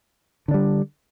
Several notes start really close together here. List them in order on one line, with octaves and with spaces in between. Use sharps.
D3 D4 G3